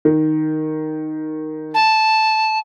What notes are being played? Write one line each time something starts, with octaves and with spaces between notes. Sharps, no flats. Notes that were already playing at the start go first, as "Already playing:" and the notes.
D#3
A5